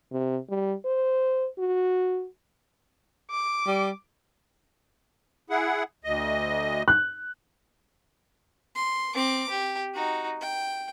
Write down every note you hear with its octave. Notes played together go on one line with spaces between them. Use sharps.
C3
G3
C5
F#4
D6
G3
E4 G#4 F#5
D2 D#5
F#6
C6
C4 D6
G4
D#4 F#4
G5